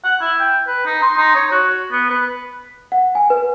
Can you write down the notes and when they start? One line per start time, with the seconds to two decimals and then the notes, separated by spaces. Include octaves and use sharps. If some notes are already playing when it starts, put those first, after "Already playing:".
0.04 F#5
0.21 E4
0.39 G5
0.67 B4
0.86 D#4
1.02 C6
1.17 D#4
1.35 C#5
1.52 F#4
1.91 B3
2.10 B4
2.92 F#5
3.15 G#5
3.30 B4